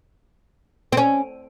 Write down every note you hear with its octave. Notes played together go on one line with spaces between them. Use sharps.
C4
C#4